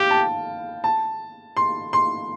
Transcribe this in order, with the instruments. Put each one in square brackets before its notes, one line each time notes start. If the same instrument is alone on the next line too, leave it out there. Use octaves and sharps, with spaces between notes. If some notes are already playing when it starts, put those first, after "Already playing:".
Already playing: [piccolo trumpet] G4 [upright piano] F5 G5
[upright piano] A5
A5
C6
C6